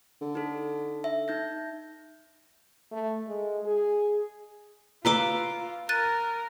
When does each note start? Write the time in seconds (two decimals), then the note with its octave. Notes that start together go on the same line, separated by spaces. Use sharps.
0.21 D3
0.35 D#4 A4
1.04 E5
1.28 D#4 G6 A#6
2.92 A3
3.28 G#3
3.66 G#4
5.05 F4 B4 A#5 C6 D6 E6
5.89 A#4 F#6 A6 D#7